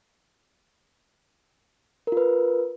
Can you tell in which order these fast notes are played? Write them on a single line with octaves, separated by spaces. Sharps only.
A#4 F4 B4